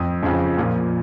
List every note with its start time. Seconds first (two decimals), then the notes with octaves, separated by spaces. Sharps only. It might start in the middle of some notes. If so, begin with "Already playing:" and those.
Already playing: F2 D#6
0.23 F2 C#3 F3
0.57 A#2 F3